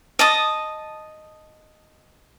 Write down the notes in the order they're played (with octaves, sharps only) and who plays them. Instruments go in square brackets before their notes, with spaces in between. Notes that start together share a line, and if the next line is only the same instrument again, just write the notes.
[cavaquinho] D#5 A5 D#6